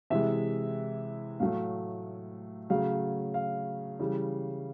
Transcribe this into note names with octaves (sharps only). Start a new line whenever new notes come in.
C3 E3 G#3 E5
A2 F#3 A3 F5
C#3 F#3 A3 F5
F5
C#3 E3 G3